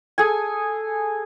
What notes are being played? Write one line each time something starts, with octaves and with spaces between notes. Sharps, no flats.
G#4 A4 G#5